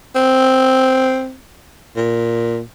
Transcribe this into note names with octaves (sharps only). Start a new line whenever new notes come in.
C4
A#2